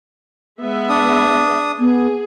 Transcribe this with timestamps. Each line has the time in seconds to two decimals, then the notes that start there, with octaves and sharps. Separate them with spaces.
0.60 G#3 B3 E5
0.89 D4 D#6
1.79 B3 G#4